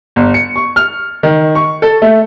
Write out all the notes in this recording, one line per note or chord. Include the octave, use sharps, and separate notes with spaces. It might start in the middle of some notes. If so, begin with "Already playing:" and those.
G1
C#7
C#6
F6
D#3
C#6
A4
A3